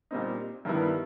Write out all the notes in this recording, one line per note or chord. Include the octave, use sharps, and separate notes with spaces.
A#2 G3 C4 D#4
G2 D#3 G3 B3 E4